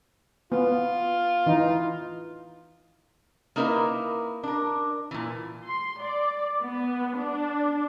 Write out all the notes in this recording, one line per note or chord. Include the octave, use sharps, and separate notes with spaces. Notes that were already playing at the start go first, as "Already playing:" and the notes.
B3 F4
E3 D#4
A#3 D#4 E4 A#4 B4 D5
D4 A#4
A#2 E3
C6
D5
B3
D4